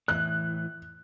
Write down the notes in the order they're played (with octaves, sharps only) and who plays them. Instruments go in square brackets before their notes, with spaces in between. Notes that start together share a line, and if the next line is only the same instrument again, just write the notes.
[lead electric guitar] A2 E3 [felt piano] F#6